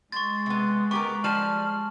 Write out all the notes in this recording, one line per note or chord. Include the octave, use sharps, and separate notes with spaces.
G#3 C6 C#6 A6
C3 B3
B3 G4 A#4 C#6 D6
F3 G3 A5 F6 E7 F#7